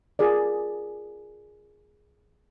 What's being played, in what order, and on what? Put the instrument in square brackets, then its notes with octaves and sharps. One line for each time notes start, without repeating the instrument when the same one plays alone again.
[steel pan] F4 G#4 A#4 D5